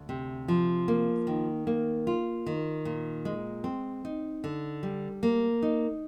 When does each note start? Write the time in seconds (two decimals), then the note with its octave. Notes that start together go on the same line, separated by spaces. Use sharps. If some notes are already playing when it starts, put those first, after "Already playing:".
Already playing: D2
0.09 C3
0.48 F3
0.88 A#3
1.27 D#3
1.67 A#3
2.07 F4
2.46 D#3
2.85 A#2
3.25 G#3
3.64 C4
4.05 D#4
4.44 D3
4.83 G3
5.23 A#3
5.62 D#4